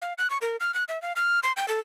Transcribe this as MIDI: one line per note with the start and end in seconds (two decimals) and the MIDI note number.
0.02 0.13 77
0.18 0.30 90
0.30 0.38 85
0.42 0.56 70
0.60 0.74 89
0.74 0.84 90
0.88 1.01 76
1.02 1.13 77
1.16 1.40 89
1.43 1.52 84
1.57 1.68 79
1.68 1.79 69